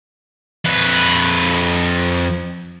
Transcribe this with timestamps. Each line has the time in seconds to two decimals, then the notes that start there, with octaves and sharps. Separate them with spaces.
0.65 F2 B4